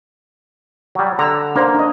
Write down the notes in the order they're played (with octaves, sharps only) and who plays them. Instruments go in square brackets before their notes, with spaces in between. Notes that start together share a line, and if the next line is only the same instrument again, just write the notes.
[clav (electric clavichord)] F#3 G3
[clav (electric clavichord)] D3 [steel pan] A#5 E6
[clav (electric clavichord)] A#3 [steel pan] D4 C5 A#5
[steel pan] D4 D#5